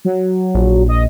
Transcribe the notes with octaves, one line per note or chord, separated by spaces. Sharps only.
F#3
A#1
D#5